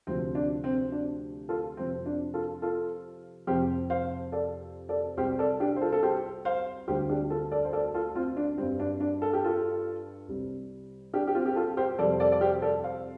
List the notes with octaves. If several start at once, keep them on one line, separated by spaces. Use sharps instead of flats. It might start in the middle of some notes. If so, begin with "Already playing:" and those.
D2 C3 F3 C4
D4
C4
D4
F4 A4
F2 C3 F3 C4
D4
F4 A4
F4 A4
F2 C3 F3 G4 C5
C5 F5
A4 D5
A4 D5
C2 C3 G3 G4 C5
A4 D5
D4 G4
C5
F4 A4
A4
G4 C5
C5 F5
D2 D3 G3 G4 C5
D4 G4
F4 A4
A4 D5
C5
A4 D5
F4 A4
C4 F4
D4
G2 G3 C4
D4
D4
A4
G4
F4 A4
C2 C3 G3
D4 G4
G4
C4 F4
G4
F4 A4
G4 C5
F2 C3 G3 A4 D5
C5
A4 D5
D5
G4 C5
A4 D5
C5 F5